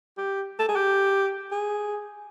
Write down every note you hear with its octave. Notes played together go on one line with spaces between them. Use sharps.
G4
A4
G#4
G4
G#4